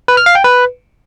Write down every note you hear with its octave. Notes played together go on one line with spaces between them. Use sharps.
B4
F6
F5
G5
B4